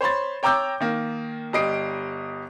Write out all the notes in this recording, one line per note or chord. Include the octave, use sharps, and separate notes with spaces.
C5 C#5 B5 C6 A6
C#5 G5 A#5 D6 E6 G6
D#3 A#3
G1 G3 D#5 C7 D7